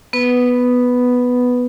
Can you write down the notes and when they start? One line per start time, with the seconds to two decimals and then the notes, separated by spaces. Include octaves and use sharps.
0.13 B3 B4